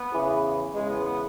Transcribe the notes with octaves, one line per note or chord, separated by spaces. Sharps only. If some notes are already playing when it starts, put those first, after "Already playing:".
Already playing: B3
E2 C#3 E3
E2 C#3 E3 G#3
B3
B3